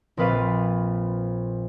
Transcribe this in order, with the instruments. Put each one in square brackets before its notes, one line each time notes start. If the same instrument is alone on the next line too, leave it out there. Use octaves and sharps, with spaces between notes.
[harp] A#1 C4 B4 F5 A6 D#7